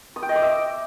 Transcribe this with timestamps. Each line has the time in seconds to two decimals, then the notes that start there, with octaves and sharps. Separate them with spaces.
0.16 D#6
0.23 G5
0.29 D#5
0.36 D6
0.42 E5